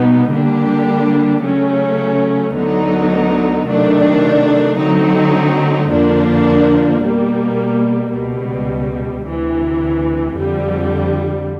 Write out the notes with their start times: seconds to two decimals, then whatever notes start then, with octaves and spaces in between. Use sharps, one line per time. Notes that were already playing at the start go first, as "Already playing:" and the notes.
Already playing: B2 G3 B3 D#4
0.30 D3 G3 A#3 D4 G4
1.42 C#3 F#3 A3 C#4
2.54 D2 D3 F#3 B3 D#4
3.66 C3 D#3 F#3 A3 D4
4.78 D3 F#3 A3 C4 D#4
5.89 F2 D3 F3 A#3 D4
7.02 B2 G3 A#3
8.13 C#2 B2 G3
9.26 D2 C3 E3
10.37 F2 D3 G3